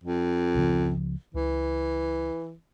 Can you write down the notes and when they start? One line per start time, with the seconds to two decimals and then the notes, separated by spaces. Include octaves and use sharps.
0.04 F2
0.55 C#2 C#3 F3
1.34 C#2 E3